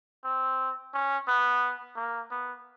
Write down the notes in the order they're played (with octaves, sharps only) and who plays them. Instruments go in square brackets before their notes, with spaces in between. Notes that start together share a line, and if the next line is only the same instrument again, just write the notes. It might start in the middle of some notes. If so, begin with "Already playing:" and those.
[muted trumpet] C4
C#4
B3
A#3
B3